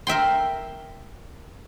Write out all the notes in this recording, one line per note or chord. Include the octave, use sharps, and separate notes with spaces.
A#4 E5 G5 C6